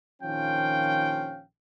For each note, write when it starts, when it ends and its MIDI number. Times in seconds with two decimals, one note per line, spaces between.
0.22 1.43 34
0.22 1.43 51
0.22 1.43 53
0.22 1.43 61
0.22 1.43 77
0.22 1.43 79